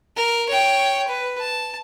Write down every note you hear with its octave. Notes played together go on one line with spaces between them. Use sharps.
A#4
C#5 G5
B4
A5